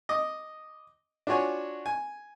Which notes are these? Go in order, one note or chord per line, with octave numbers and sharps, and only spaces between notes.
D#5 D6 D#6
D4 F4 F#4 C#5 G#5
G#5